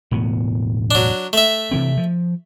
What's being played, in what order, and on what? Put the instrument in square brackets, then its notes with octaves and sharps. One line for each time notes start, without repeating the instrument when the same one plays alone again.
[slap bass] E1 A2 B3
[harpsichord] F#3 D4
A3 E5
[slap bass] C3 E3 C4
F3